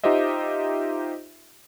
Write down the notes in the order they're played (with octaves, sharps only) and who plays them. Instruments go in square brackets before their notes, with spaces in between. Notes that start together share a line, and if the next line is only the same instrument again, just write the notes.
[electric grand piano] D#4 F4 G4 C5 D#5 E5